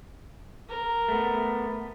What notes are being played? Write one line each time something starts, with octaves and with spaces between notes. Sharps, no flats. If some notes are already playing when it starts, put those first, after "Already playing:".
A#4
A3 B3